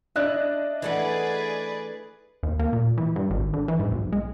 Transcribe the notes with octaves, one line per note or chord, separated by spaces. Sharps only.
D4 E4 D#5 E5 F#6
E3 A3 G#4 B4 D5 F#5
D#2
A#3
A#2
E3
G2
G#1
D3
E3
G#2
B1
G#3